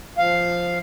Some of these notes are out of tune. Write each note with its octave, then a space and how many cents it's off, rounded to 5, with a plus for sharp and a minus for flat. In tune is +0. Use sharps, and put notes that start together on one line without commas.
F3 +0 F5 +0